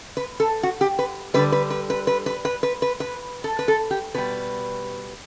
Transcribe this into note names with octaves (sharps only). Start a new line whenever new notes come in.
B4
A4
F#4
G4
B4
D3 G3 B4
B4
B4
B4
B4
B4
B4
B4
B4
B4
A4
B4
A4
G4
B2 G3 B4